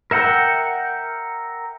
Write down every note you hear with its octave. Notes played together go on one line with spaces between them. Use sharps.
A#4 E5 F#5 G5